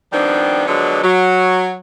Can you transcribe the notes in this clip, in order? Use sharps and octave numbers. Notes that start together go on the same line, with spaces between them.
D#3 F3 G3 B3 C4 D4
D3 F3 F#3 G#3 B3 D4
F#3